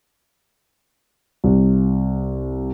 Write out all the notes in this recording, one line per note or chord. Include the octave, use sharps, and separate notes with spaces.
C2